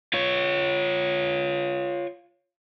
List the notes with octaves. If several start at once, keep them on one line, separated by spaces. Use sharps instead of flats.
F4 C#5